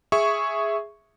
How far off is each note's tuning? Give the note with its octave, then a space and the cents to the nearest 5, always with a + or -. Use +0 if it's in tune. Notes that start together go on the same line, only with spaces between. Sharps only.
G#4 +0 E5 +0 C#6 +0